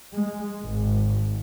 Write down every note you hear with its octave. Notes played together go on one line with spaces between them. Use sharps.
G#3
G#1